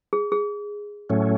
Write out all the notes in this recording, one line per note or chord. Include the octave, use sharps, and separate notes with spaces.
G#4
G#4
A2 F#3 A3 C#4